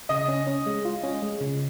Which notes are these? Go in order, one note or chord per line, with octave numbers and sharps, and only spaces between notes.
C#3 D#5
C#4
C#4
G#3
F4
C#4
G#3
C#3